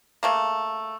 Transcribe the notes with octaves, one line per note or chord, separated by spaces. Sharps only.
C#3 A3 A#3